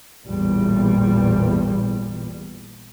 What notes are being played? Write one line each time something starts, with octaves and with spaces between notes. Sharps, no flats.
A1 E2 A#2 G3